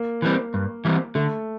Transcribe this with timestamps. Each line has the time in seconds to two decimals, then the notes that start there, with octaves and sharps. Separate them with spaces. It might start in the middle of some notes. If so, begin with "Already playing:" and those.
Already playing: A#3
0.22 E3 G3 C4
0.54 G2
0.85 E3 G3 C4
1.15 D3 A3